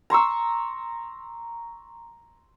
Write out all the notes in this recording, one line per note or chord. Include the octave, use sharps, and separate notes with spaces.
A#5 C6 C#6 E6